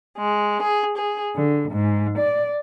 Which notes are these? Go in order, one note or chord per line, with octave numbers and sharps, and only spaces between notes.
G#3
G#4
G#4
D3
G#2
D5